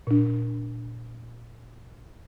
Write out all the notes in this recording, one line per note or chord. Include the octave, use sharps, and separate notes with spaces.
A#2 D4